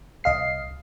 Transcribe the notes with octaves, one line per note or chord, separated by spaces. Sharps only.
C2 D#5 F5 C7